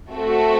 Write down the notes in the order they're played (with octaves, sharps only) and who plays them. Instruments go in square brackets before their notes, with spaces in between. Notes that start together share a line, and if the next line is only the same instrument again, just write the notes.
[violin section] A3 C4 F#4 A4